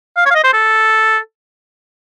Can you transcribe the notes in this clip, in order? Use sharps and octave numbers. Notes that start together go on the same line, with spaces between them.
F5
C#5
F5
D#5
C5
A4